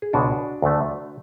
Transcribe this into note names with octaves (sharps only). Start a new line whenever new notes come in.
G#4
C#2 B2 G#3 D4 F#4
D2 D3 A3